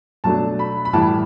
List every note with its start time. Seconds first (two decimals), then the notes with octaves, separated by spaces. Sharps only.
0.24 B2 F#3 A3 D4 A5
0.59 B5
0.85 B5
0.93 A2 E3 G3 A5